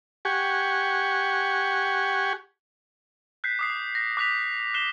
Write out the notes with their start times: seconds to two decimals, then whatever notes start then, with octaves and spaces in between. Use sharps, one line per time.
0.25 G4 F#5 G#5 C#6
3.44 F#6 G6 B6 C7
3.59 D6 D#6 C7
3.95 A#6
4.17 D6 F#6 B6 F7
4.74 F#6 C7 E7 G7